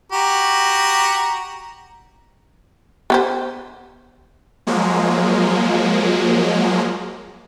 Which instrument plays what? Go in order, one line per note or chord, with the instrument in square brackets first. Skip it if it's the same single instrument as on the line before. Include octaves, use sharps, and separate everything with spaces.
[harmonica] F#4 G4 A#5
[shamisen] B3 G4 C5
[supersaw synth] F3 F#3 G#3 A#3